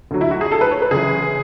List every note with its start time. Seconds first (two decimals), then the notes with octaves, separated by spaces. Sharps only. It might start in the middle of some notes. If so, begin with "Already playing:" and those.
0.11 D2 D3 F#3
0.21 E4
0.31 F#4
0.41 G#4
0.52 A4
0.61 B4
0.71 C#5
0.82 B4
0.91 F#1 F#2 E3 G#4